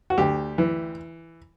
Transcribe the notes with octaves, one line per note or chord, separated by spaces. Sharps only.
F#4
D2 G4
E3